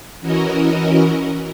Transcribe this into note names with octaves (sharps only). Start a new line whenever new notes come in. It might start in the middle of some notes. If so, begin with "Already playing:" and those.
E3 C#4 E4 F#4 A#4 D#5